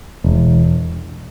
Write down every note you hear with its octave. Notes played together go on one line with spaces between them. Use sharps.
E1